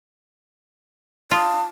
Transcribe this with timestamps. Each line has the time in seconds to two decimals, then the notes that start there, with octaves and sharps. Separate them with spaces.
1.31 F4 F5 A5 D#6